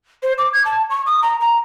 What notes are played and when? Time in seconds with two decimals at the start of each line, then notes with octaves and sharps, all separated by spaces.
0.23 C5
0.38 D6
0.53 G#6
0.65 A5
0.90 C#6
1.06 D#6
1.22 A#5
1.40 A#5